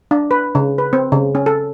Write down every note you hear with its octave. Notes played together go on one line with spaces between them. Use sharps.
D4
B4
C#3
B4
C4
C#3
C#4
A4